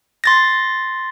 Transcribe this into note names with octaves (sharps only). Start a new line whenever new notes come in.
C6 A6 A#6